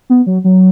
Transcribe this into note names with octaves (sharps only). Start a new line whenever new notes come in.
B3
F#3
F#3